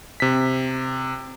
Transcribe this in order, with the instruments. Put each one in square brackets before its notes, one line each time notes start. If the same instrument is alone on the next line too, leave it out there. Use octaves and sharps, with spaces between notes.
[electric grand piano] C3 B6